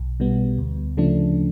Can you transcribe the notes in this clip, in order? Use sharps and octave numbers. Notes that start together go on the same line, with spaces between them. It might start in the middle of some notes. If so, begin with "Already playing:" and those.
Already playing: B1
B2 G3 B3
D2
C#3 F3 A3 D4